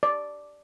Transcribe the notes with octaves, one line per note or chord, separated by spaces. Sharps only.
D5